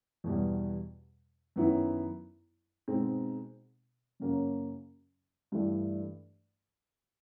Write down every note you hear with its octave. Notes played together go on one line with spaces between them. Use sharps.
E2 B2 G3
F#2 D#3 F#3 B3 E4
B2 G#3 C4 D#4
F#2 C#3 F#3 A#3 C#4
G2 E3 A3 D4